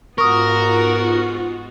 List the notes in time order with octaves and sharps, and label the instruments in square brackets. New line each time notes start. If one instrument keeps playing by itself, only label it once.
[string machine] G#2 F4 [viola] B3 F#4 [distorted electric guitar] A#4 [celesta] C#6 D#6